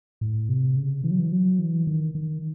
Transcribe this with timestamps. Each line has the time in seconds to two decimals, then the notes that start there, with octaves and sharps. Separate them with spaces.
0.21 A2
0.49 C3
0.77 C#3
1.04 E3
1.11 F#3
1.19 E3
1.32 F#3
1.59 E3
1.87 D#3
2.15 D#3